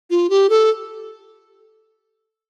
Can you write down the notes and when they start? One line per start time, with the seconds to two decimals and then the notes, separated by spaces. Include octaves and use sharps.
0.10 F4
0.30 G4
0.50 A4